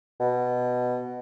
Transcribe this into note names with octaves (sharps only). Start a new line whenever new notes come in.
B2